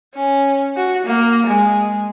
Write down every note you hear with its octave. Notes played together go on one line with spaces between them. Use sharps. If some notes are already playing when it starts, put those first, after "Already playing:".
C#4
F#4
A#3
G#3